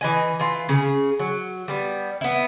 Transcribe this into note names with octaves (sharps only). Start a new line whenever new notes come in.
E3 D#5 G#5
E3 F4
C#3 G#4
F#3
G3 B3
B3 E4